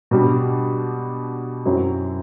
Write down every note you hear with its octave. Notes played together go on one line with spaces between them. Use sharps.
B2 G3 D4
F#2 F#3 C4 E4